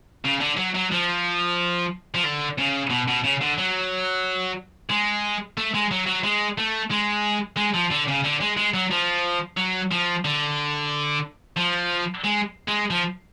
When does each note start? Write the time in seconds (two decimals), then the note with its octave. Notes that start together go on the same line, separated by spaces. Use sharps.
0.25 C#3
0.40 D3
0.57 F#3
0.75 F#3
0.91 F3
2.15 F3
2.24 D3
2.58 C#3
2.90 B2
3.08 B2
3.24 C#3
3.41 D3
3.57 F#3
4.90 G#3
5.57 A3
5.74 G#3
5.91 F#3
6.07 F#3
6.24 G#3
6.58 A3
6.91 G#3
7.57 G#3
7.74 F3
7.91 D3
8.08 C#3
8.24 D3
8.41 G#3
8.57 G#3
8.74 F#3
8.91 F3
9.57 F#3
9.91 F3
10.25 D3
11.57 F3
12.24 G#3
12.68 G#3
12.90 F3